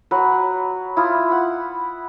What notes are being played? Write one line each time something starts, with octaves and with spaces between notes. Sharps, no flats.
F#3 B4
E4 F4 D#6
F#5